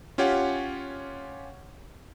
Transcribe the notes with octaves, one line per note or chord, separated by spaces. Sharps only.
C#4 F4 G4 C#5 F#5